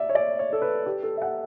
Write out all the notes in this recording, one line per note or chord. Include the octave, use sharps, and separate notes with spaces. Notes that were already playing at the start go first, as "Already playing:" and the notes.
Already playing: D5 E5
C#5
D5
C#5
A4
B4
G4
A4
E5
F#5